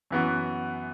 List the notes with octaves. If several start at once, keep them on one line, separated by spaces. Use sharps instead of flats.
F#2 E3 B3 F#4